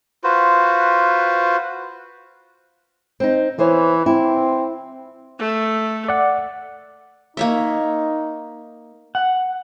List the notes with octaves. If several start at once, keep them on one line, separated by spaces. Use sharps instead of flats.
F4 F#4 B4 C5
C4 D#4
E3 B3 C5 C#5
C4 E4
A3
D5 F#5
A#3 D#4 C#5 E5
F#5